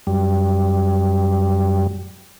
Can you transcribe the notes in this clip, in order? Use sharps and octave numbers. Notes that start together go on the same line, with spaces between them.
F#2 G3